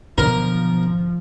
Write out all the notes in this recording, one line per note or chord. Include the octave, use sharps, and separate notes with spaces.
B2 D3 F3 F#3 B3 A#4